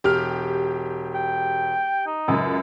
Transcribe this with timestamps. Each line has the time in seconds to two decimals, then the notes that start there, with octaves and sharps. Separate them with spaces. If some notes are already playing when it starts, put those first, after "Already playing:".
0.04 E1 G4 F6
1.15 G5
2.06 D#4
2.28 C#2 F#2